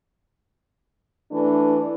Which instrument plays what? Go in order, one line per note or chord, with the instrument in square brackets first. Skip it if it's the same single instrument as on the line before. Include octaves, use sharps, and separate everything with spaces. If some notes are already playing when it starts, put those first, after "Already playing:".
[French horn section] E3 A3 D4